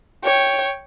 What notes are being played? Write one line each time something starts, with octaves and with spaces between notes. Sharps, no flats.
C#5 G5